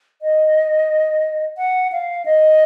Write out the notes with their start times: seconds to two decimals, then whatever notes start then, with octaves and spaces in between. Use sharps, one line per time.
0.22 D#5
1.57 F#5
1.92 F5
2.25 D#5